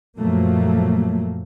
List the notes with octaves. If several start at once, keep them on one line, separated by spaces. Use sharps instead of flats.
F#2 A#2 F3 F#3 A3 A#3